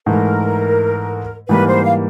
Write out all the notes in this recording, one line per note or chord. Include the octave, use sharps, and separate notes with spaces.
G#2 E3 A3 A#4
G#2 E3 G3 A#3 B4
C5
F5